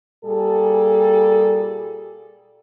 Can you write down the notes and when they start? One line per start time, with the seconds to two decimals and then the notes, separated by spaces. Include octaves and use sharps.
0.25 A#2 G3 G#4 A4